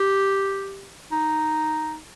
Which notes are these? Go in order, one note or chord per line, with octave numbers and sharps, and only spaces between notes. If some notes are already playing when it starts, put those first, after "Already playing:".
Already playing: G4
D#4